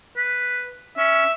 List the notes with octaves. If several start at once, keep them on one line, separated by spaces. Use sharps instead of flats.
B4
C#4 E5